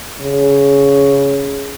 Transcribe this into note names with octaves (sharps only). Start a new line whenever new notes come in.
C#3